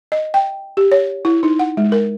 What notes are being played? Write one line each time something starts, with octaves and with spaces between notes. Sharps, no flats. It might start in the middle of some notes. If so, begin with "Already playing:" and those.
D#5
G5
G4
C#5
E4
D#4
F#5
G#3
A#4